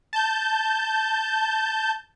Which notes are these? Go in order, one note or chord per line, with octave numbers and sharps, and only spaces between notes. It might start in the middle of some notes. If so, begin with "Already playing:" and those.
A5 G6